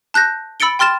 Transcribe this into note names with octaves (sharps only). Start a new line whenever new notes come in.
A5 F#6 G6 A#6
B5 E6 A6 C#7 D7 G7
G5 C6 F6 A6 E7